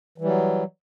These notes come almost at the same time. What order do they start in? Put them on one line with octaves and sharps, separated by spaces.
E3 G3 F#3